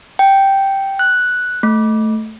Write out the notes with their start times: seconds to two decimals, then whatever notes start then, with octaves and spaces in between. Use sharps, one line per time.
0.19 G5
0.99 F#6
1.63 A3